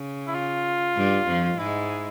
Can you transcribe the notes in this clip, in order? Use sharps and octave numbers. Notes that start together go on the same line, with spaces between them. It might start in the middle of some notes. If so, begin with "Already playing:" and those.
Already playing: C#3
E4
F4
G2 G3
F2 F3
G#2 G#3 E4